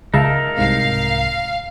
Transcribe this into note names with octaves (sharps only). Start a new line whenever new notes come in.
C#2 D#4 A#4 E5 F5 A5
C2 G#2 C3 F5